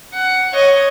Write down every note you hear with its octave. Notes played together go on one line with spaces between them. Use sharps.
F#5
C#5 D#5